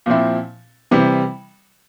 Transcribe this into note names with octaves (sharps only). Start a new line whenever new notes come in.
A#2 F3 C4 E4
C3 E3 G3